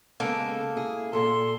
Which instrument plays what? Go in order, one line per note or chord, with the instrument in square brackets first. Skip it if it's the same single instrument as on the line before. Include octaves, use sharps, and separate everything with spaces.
[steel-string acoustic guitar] C#3 G#3 B3 [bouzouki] A#3 A4
[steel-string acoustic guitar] E4 G#4
[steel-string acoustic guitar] A#2 A4 [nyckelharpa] C6